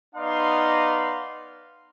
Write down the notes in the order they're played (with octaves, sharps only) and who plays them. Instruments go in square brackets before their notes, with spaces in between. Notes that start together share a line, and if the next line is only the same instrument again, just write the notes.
[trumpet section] B3 D#4 D5 F5 C6